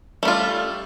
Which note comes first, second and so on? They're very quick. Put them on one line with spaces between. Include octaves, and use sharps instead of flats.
A3 G3 F4